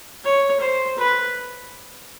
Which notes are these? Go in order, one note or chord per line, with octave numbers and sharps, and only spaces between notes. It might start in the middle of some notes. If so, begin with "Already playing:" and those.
C#5
C5
B4